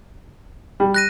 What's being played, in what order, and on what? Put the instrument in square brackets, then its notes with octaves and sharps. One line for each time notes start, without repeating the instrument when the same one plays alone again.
[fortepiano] G3
[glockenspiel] F#6 A#6 D#7